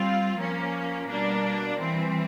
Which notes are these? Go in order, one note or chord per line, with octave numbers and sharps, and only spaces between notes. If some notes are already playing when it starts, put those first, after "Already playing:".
Already playing: G3 C4 F4
F3 A#3 C#4
B2 G3 A#3 D4
E3 G3 C4